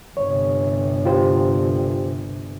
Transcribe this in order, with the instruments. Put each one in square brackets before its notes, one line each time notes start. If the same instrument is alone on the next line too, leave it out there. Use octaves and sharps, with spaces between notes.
[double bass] G1 C3 [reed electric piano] C#5
[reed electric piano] F4 G4 C5